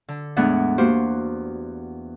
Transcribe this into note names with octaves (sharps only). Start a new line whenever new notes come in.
D3
E2 A2 G#3 B3 D4 F#5
A#3 F#4 G4 C5